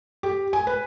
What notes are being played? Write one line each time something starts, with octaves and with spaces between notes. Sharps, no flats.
G4
G#5
B4